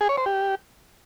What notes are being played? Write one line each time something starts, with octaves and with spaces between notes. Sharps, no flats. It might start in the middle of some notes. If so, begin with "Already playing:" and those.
G#4
C#5
C5
G4